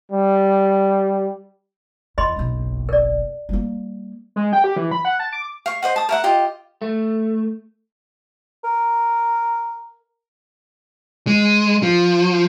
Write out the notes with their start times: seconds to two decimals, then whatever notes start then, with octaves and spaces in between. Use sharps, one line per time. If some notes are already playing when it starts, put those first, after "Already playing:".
0.12 G3
2.18 E2 D#5 B5 C6
2.36 F#1 B1
2.89 A#4 D5
3.49 G3 A#3
4.36 G#3
4.53 G5
4.64 G4
4.76 E3
4.91 B5
5.05 F#5
5.20 A5
5.33 D6
5.66 F5 C#6
5.82 C5 D#5 F#5
5.96 A5 D#6
6.09 A#4 E5 F#5
6.24 F4 G4 D#5
6.82 A3
8.64 A#4
11.27 G#3
11.83 F3